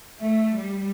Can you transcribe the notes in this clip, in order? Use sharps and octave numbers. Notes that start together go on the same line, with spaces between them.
A3
G3